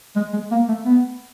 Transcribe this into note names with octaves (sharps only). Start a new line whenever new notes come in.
G#3
G#3
A#3
A3
B3